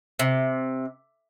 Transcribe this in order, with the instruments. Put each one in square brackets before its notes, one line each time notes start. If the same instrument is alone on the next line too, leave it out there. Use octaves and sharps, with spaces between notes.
[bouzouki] C3